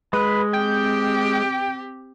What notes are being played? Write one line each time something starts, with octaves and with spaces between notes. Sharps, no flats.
G#3 B4
C4 G4 G5